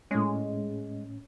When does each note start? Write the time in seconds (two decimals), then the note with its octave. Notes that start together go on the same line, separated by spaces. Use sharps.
0.11 A2 G#3 C#4